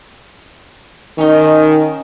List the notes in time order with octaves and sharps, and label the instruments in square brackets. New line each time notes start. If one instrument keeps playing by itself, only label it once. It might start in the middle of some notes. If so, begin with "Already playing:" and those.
[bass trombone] D#3 [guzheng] C#4 D#4